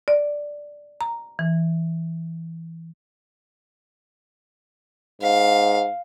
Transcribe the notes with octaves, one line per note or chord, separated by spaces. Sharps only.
D5
A#5
E3
G#2 F5